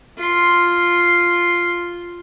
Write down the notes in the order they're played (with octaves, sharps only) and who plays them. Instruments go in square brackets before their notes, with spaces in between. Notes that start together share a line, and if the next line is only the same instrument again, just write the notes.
[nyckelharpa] F4 C6